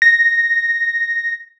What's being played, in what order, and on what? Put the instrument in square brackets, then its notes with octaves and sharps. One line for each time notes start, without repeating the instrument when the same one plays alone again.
[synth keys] A#6